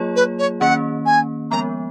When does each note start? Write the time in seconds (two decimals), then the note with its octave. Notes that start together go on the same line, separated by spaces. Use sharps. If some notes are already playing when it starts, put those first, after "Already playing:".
Already playing: F#3 A#3 F4 G#4 C#5
0.16 B4
0.39 C#5
0.61 D#3 A#3 C#4 F#5
1.06 G#5
1.51 F3 G#3 B3 A#5